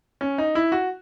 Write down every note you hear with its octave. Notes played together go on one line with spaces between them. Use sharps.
C#4
D#4
E4
F#4